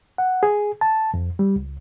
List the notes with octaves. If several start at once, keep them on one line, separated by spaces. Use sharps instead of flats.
F#5
G#4
A5
F2
G3
C#2